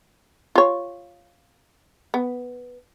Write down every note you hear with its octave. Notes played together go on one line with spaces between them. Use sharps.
F4 C#5
B3